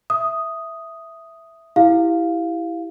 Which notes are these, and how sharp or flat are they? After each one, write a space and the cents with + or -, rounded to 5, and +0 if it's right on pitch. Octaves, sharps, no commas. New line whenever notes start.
E5 +0 D#6 +0
E4 +0 G4 +0 F5 +0